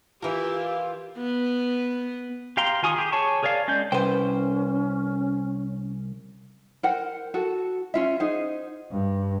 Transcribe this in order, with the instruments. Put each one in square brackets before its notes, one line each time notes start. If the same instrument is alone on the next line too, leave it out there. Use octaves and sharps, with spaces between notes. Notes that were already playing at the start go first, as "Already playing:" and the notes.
[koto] E3 A#4 [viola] E4 G4 [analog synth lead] F4
[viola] B3
[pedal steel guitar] G4 F5 G5 A#5 C6
D#3 F4 G#5 C#6 D#6
G4 G#4
G#4 C#5 G#5 A5 C#6
G#4 A#4 C#5 D5 F5
G#3 C#4 D5 G6
[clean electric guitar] C2 C5 [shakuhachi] C#4 [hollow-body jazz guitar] B4 G5
[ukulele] A#4 C5 F#5 G5
F#4 A4 F#5
C#4 F4 E5
D#4 G#4 C5 F#5
[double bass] G2